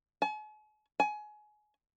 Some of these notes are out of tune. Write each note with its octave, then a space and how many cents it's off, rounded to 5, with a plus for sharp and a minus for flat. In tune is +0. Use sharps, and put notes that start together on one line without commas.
G#5 +45
G#5 +25